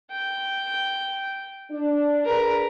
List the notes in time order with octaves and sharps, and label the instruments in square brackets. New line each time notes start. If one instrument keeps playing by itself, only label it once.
[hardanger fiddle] G5
[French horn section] D4
[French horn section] D4 G#4 B4 [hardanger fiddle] A#4